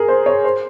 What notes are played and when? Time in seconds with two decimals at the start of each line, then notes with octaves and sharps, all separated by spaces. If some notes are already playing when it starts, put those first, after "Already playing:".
Already playing: G#4 A#4
0.08 C5
0.26 C#5
0.44 C5